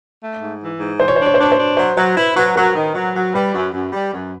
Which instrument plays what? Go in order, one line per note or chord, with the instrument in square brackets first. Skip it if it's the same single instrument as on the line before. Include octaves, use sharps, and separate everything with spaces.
[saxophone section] A3
G#2
E3
G#2
[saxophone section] E3 [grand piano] C5
[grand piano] C#5
[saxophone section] D4 [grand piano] C5
[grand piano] C#5
C5
[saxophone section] D4 [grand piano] C#5
[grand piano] C5
[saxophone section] D4
[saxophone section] F#3 [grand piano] C5
[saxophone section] F#3 [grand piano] C5
[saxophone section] E4 [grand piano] B4
[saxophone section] F#3 [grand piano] B4
[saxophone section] F#3 [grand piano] A#4
[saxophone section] D#3
F#3
F#3
[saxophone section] G3 [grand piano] B4
[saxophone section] F#2
F#2
G3
F#2